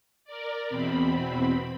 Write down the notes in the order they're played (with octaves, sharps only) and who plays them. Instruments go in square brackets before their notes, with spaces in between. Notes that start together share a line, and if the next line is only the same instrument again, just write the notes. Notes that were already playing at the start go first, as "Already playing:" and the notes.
[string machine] A#4 D5
E2 B2 C4 B5